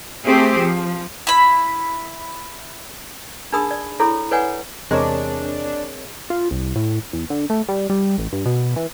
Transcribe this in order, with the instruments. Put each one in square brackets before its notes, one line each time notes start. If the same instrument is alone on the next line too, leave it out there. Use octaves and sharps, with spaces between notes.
[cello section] A3 C4 G4 G#4
F3
[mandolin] E4 B5
[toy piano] D4 D#4 G#4 A#4 B5 D#6
D5
E4 A4 C#5 B5 D6
A4 B4 C#5 D5 F#5 G#5
[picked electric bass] E2 C3 [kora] G#3 [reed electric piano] C4 A#4 C#5 [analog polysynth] D4
[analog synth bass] F4
C2
A2
E2
D3
A3
G3
G3
A1
G2
B2
E3